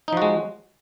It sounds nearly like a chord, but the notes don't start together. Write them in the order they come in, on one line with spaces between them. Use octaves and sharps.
D#4 F3 F#4 G#3